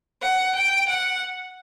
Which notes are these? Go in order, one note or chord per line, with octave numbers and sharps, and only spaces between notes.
F#5
G5
F#5